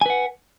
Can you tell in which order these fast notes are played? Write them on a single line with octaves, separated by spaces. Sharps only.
G#5 B4 F#5